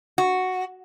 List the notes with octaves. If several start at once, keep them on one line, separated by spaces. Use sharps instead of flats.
F#4